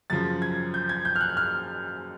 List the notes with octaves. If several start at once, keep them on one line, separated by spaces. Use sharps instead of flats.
F#2 C#3 F3 A6
G#6
G6
G#6
G6
F6
F#6
F6